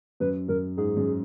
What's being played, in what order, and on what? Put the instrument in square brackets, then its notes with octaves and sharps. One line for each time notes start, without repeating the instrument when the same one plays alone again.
[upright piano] F#2 [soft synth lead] B4
[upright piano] F#2 [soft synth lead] A#4
[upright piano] G#2 [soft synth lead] G#4
[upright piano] F#2